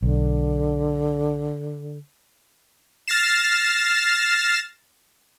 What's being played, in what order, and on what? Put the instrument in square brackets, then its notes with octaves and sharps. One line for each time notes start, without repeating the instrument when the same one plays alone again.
[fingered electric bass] B1 [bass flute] D3
[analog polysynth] F6 A6 A#6 C7 E7